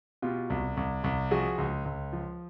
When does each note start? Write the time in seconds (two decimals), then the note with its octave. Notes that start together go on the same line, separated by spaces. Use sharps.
0.22 B2 F4 G4
0.50 C2
0.77 C2
1.04 C2
1.31 F3 F#4 G#4
1.58 C#2
1.85 C#2
2.13 F3